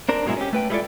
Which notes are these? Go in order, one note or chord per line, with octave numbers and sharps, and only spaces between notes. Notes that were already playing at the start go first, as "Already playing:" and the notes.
C4 D4 A#4
G#2 B2 F#3 G#3 E4 G#4
C#4 G4
A3 B4 G5
G3 G#3 E4 F4 A4 D5